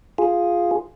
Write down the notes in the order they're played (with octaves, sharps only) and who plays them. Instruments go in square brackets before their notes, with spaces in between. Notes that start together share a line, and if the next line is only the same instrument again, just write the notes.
[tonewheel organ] F4 G#4